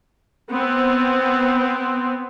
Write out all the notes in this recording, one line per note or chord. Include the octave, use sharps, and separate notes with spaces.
B3 C4